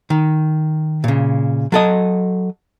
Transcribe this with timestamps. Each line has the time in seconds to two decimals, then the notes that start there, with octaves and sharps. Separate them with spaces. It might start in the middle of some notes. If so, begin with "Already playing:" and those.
0.10 D#3
1.04 A#2 C#3
1.72 F#3 A4 D#5